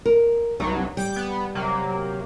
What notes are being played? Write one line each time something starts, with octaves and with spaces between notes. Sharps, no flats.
A#4
C2 G2 F#3 D#4
G3 D6 G6 D7
B3
C3 F#3 A#3